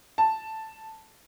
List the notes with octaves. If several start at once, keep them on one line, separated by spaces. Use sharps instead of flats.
A5